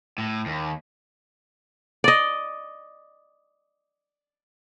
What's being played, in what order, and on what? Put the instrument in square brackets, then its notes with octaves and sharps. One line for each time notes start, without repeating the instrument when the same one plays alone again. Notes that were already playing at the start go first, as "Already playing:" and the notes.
[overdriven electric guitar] A2
D#2
[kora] D5 D#5